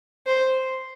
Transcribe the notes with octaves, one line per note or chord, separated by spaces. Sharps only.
C5